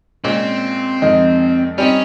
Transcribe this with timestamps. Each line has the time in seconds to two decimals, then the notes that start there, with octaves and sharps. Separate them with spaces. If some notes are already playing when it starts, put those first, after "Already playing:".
0.24 A#2 G#3 C4 C#4 F4
1.02 F2 D#3 G#3 D#4
1.78 G3 C4 C#4 D#4